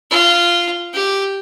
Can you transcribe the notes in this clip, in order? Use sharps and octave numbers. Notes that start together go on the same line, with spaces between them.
F4
G4